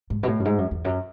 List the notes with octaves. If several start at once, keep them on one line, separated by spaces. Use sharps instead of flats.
G#2
B2
A2
F#2
G#2
F#2
E2
F#2